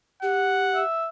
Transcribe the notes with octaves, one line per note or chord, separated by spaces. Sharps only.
G4 F#5
E5